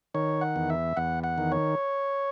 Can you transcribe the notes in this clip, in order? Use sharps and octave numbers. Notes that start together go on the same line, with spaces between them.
D#3 C#5
F#5
E2
E5
E2 F#5
F#5
D#3
C#5